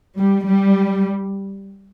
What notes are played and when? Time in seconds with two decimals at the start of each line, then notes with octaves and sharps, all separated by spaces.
0.18 G3
0.46 G3